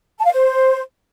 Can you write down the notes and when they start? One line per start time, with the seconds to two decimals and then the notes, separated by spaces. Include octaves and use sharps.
0.18 A5
0.25 F5
0.31 C5